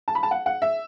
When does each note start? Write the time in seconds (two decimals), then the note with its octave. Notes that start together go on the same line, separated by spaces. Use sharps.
0.08 A5
0.15 B5
0.23 A5
0.31 F#5
0.46 F#5
0.62 E5